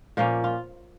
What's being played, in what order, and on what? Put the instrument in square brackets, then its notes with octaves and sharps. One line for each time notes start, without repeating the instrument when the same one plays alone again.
[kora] A#2 F3 A#3 C#4
F4